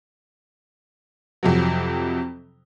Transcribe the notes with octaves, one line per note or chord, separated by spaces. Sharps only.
F2 C3 F#3